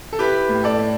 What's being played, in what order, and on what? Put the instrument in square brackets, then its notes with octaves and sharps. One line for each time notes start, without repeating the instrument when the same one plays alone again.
[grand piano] A4
E4 G4 B4
A2
A4 D5
A2